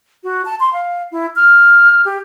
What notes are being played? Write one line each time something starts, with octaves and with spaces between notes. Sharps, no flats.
F#4
A5
C6
F5
E4
F6
G4